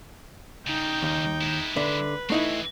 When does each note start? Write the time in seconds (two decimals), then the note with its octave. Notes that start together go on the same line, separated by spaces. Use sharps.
0.67 C#3 G3 D#4 G5
1.02 D#2
1.41 G#3 E4
1.76 D3 B4 E5
2.30 E3 A3 C4 D#4 E4